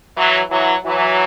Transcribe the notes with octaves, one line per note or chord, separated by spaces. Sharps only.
E3 F#3
E3 F#3
E3 F#3